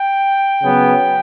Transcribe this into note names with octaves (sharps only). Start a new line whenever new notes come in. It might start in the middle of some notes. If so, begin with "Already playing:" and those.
Already playing: G5
C#3 F#3 B3